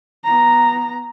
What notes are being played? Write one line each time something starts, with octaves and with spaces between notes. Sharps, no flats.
B3 A#5